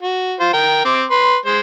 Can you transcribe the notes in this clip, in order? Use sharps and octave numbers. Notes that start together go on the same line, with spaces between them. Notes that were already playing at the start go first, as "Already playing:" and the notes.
F#4
F4 C5
A#4 G5
C4 D6
B4 C6
G#3 C5